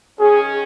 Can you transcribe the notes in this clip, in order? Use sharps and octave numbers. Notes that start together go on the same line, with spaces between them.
D#3 C#4 G#4